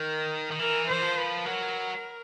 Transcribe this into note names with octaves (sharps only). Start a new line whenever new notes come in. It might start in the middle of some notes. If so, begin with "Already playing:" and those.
Already playing: D#3 A#4
D#3
E3 A#4
E3 C5
F3
B4
F#3 A#4